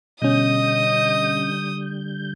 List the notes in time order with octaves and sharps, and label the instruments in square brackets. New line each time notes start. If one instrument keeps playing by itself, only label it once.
[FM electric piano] B2 C#4 [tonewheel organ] D3 G3 G6 [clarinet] D#5 [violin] D#6